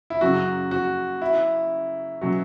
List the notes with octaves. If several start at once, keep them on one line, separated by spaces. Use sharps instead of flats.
E4
F#2 C#3 F#3 C#4 F#4
F#4
E4
B2 F#3 C#4 F#4